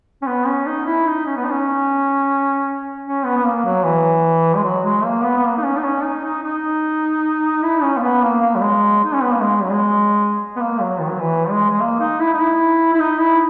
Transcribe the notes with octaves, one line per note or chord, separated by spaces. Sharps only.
C#4
B3
C#4
D#4
E4
D#4
C#4
B3
D#4
C#4
C#4
B3
B3
A#3
F#3
E3
G#3
F#3
G#3
A#3
B3
B3
A#3
D#4
C#4
D#4
C#4
D#4
D#4
D#4
E4
C#4
A#3
B3
A#3
A#3
F#3
G#3
D#4
C#4
B3
A#3
G#3
F#3
G#3
B3
A#3
F#3
D#3
F#3
E3
G#3
G#3
A#3
D#4
E4
D#4
E4
E4
D#4
E4